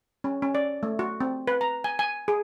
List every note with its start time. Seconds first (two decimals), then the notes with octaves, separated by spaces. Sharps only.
0.24 C#4
0.42 C#4
0.55 D5
0.83 A3
0.99 F#4
1.21 C4
1.47 B4
1.61 A#5
1.84 G#5
1.99 G#5
2.28 G#4